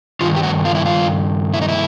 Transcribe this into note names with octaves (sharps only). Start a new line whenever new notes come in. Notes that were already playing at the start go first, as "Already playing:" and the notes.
G2 D#3 F4
G4
F#4
F4
E4
F4
E4
D#4
E4